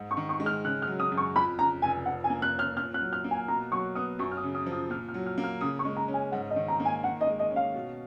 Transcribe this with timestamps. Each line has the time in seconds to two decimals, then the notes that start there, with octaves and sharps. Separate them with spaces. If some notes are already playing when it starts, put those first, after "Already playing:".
Already playing: G#2
0.11 C#6
0.17 D#3
0.29 C#6
0.40 G#3
0.46 F6
0.64 C#3 F#6
0.82 F6
0.87 F#3
1.00 D#6
1.12 F#2
1.17 C#6
1.35 F2 B5
1.59 C#3 A#5
1.82 F1 G#5
2.06 F3 F#5
2.24 G#5
2.30 A#3
2.42 F#6
2.54 C#4
2.59 F6
2.77 A#2 F6
2.94 F#6
3.01 F#3
3.13 F6
3.24 A#3
3.31 G#5
3.48 B2 A#5
3.72 F#3 C#6
3.95 B3 D#6
4.19 F#2 C#6
4.31 F6
4.37 D#6
4.43 C#3
4.55 D#6
4.66 F3
4.72 D#6
4.90 A#2 F6
5.09 F6
5.14 F#3
5.26 F6
5.38 A#3
5.44 F6
5.61 C#3 D#6
5.79 C#6
5.85 G#3
5.97 A#5
6.08 C#4
6.14 G#5
6.32 G#2 F#5
6.50 D#5
6.56 D#3
6.68 A#5
6.80 A#3
6.85 G#5
7.03 D#3 F#5
7.21 D#5
7.26 G#3
7.39 D#5
7.51 C#4
7.56 F5
7.74 B2